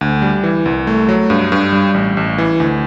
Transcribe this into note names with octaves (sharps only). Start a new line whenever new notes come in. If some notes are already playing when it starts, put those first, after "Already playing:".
D2
G3
E3
C2
A3
F#3
G2
G2
G3
A1
A1
E3
D2